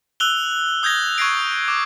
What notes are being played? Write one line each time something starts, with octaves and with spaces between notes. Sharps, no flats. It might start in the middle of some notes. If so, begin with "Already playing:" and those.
E6 F#6 F7 G7
D#6 G6 G#6 A#6 G7
C#6 F#6 G#6 A#6 C7 D7
D6 G6